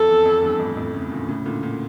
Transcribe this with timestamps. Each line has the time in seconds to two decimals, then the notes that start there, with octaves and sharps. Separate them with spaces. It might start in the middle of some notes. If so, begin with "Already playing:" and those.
Already playing: F2 A4
0.08 E2
0.25 F2
0.42 E2 G2
0.59 F2 A2
0.76 F2 A2
0.94 A2 C#3
1.11 A#2 D3
1.29 A2 C#3
1.45 A#2 D3
1.63 A#2 D3